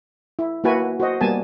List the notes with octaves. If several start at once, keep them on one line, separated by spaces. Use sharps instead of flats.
E4
A#3 E4 F#4 B4 G#5
F#4 C5 D#5
G3 A#3 B3 G#5 A5